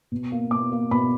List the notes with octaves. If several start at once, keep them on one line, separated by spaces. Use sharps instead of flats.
B2
A#3
B2 D6
A#3
B2 B5